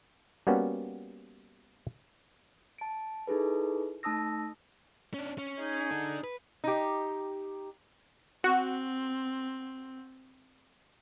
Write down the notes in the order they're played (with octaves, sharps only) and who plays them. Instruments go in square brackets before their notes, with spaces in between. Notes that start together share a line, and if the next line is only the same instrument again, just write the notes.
[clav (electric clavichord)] G3 A#3 B3 C#4 F#4
[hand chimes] A5 D7
D#4 E4 G#4 A4 B4
A3 D#4 A5 D#6 E6 A#6
[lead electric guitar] C#4 D4
C#4
[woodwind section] D#4 G#4
[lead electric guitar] D4 A4
B4
[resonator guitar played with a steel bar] D#4 G4
[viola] C4 [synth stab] F#4